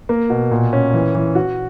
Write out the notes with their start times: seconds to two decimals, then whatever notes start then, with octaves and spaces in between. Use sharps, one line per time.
0.09 A#3
0.30 B2
0.51 A#2
0.73 C#4
0.94 E3
1.15 E3
1.35 F#4